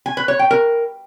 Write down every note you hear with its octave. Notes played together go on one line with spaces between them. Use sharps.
G#5
B4
C#5
G5
A#4